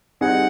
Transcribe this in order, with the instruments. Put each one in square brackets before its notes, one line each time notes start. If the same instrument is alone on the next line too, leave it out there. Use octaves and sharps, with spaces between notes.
[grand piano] G3 C4 D#4 G#4 [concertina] F#5